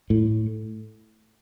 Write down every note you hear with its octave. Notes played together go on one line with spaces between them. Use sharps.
A2